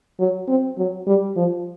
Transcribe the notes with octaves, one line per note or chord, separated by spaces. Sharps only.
F#3
C4
F#3
G3
F3